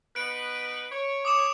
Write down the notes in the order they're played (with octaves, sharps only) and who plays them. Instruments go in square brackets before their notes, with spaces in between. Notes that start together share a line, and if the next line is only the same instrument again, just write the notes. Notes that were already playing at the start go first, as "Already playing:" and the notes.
[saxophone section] B3 D#4 B4 [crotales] D7
[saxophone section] C#5
[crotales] D6 D#6 E7